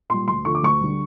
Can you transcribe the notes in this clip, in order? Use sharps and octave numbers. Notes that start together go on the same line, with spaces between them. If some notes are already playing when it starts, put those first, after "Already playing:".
A#2 G3 C6
D2 C6
D3 F3 A3 C#6
D6
D2 C#6
D3 G3